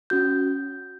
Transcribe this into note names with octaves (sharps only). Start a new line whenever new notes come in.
C#4 F#4 G6